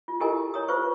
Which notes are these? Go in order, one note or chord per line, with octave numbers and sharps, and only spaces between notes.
F4
E4 G4 A4 A#4 D#5 G#5
C#5 A#5 D#6
F4 B4 C5 C#6